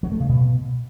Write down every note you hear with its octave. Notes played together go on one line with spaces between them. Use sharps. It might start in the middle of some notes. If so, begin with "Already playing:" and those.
F#3
A3
C#3
B2